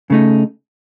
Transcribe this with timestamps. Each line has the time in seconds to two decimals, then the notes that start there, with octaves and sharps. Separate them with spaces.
0.10 C#3 A3 D#4